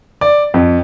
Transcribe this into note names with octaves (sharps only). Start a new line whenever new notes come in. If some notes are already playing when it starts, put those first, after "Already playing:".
D5
F2